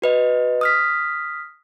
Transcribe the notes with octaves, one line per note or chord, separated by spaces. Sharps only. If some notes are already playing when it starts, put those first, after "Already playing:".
F#4 B4 D#5
D#6 F6 B6